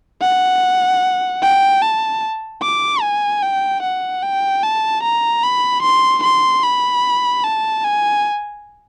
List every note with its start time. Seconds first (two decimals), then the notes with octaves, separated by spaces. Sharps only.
0.22 F#5
1.42 G5
1.82 A5
2.62 D6
3.02 G#5
3.42 G5
3.82 F#5
4.23 G5
4.63 A5
5.03 A#5
5.43 B5
5.83 C6
6.23 C6
6.63 B5
7.44 A5
7.84 G#5